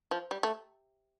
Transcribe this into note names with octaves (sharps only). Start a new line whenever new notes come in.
F3
G3
A3